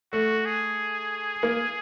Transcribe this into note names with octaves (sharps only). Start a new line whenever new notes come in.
A3 F#4
G#4
A#3